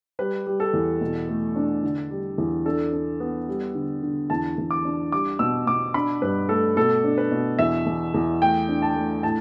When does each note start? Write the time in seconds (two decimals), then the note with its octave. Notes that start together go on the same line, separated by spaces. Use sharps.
0.19 G3 B4
0.47 G3
0.60 A4
0.73 E2
1.01 B2
1.29 A3
1.56 D4
1.83 D3
2.11 G3
2.38 E2
2.65 D4 A4
2.93 D4
3.20 B3
3.48 G3
3.75 D3
4.03 D3
4.30 E2 A5
4.58 E2
4.71 D6
4.85 D4
5.12 G3 D6
5.39 B2 E6
5.67 B2 D6
5.94 D4 B5
6.22 G2 B4
6.49 A3 A4
6.77 B2 A4
7.04 D4
7.18 B4
7.32 B2
7.59 E2 E5
7.86 E2
8.14 E2
8.42 A3 G5
8.69 D4
8.82 A5
8.96 A3
9.23 A2 A5